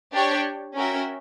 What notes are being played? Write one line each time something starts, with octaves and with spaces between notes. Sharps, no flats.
D4 G4 C#5 G5
C#4 F#4 A#4 E5 G5